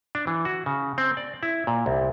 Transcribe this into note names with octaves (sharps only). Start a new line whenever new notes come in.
D4
E3
F#4
C#3
C4
D5
E4
A#2
C2